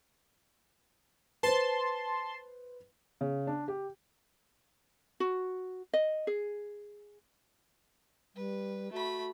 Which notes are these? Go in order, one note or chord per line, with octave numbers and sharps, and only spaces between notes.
B4 C5 A5 C6
C#3
D4
G4
F#4
D#5
G#4
G3 B4
A3 F#4 B5